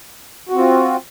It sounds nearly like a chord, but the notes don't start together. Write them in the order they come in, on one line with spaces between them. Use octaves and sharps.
F#4 C4 F4